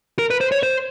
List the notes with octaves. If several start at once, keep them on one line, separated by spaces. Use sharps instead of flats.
A#4
B4
C5
C#5
C5